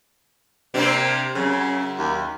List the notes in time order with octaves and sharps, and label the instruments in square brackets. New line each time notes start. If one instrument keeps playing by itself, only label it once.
[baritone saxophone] C3 [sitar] A#3 C4 D4
[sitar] F#2 [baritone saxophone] C#3
[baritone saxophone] D#2